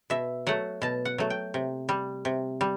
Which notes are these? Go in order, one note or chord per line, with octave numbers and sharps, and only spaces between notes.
B2 E5
F#3 A3 F#5
B2 A5
F#5
F#3 A3
G5
C3
G3
C3
G3